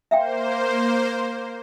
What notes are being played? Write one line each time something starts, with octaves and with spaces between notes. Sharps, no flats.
A#3 C5 E5 F5 G5